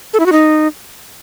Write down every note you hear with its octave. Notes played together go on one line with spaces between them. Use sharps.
A4
E4
F#4
D#4